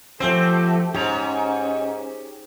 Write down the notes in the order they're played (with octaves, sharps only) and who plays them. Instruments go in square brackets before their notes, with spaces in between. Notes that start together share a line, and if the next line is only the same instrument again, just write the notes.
[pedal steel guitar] F3 F#4 C5 [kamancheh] A3 G4 [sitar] C4
[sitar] G#2 [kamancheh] C#4 [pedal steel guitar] G4 C#5 A#5